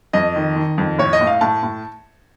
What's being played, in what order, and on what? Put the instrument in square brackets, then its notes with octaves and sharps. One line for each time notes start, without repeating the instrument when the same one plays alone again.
[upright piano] F2 D#5
D#3
D#3
F2
A2 C#5
D#5
A2
F5
A2 A5
A2